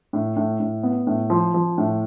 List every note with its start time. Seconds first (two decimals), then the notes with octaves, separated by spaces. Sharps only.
0.13 A2
0.36 A2
0.60 A2
0.83 B3
1.07 A2
1.30 F3
1.54 F3
1.78 A2